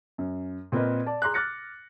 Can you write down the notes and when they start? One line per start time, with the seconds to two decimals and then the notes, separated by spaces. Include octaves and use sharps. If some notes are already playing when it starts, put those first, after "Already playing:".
0.18 F#2
0.72 A#2 C4 A#4 B4 D#5
1.06 D5 A5
1.22 G#4 A#5 C6 D6 F#6
1.34 D6 F6 F#6 A6 A#6 C#7